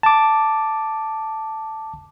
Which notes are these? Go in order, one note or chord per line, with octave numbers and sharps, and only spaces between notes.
A5 D6